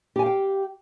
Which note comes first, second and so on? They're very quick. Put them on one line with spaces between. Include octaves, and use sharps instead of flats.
G4 G#5 F5 G5